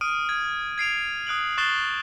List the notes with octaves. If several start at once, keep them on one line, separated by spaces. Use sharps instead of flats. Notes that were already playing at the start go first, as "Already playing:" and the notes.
D#6 F6 D7 D#7
G#6
G#6 C7 D7 F7
D#6 F#6 D7 F#7
C#6 F#6 A6 C7 E7 G7